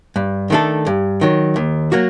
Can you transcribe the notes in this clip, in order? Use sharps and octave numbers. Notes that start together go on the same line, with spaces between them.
G2
D#3 A3 D4 A4
G2
D#3 F#3
D#2
F#3 A#3 F#4